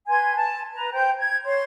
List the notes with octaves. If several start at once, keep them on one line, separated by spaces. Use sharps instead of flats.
B4 G#5 C6 G#6
A5
B4 A#5
C5 G5 G6
G#6
C#5 C6